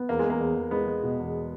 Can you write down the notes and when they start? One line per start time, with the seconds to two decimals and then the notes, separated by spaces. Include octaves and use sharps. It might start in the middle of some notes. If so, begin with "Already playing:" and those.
Already playing: B3
0.09 E2 A#3
0.19 G#3
0.25 E2
0.30 A#3
0.41 E2
0.56 E2
0.71 G#3 B3
0.88 G#3
1.03 B2
1.20 E2